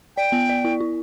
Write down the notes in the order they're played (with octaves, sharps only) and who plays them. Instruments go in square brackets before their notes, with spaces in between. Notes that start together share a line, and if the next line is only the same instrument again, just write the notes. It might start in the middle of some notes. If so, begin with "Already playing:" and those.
[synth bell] D5 [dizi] G5
[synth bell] B3
D5
E4
E4